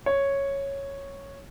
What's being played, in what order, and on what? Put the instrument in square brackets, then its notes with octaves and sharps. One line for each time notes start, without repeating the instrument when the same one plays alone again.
[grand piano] C#5